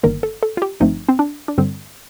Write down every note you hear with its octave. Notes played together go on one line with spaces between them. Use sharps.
G1 G2 D#3 A#3 A#4
A4
A4
F4
G4
G1 G2 F3 A3 C4 D#4
C4
D4
D4
G2 D3 G3 C4